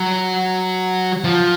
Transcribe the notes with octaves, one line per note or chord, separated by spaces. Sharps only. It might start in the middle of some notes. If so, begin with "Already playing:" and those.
Already playing: F#3
F3